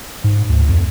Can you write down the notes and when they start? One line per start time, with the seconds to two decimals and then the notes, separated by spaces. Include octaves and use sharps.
0.24 G#2
0.49 D2
0.69 F2